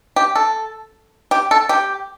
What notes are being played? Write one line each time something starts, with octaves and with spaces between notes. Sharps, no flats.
G4
A4
G4
A4
G4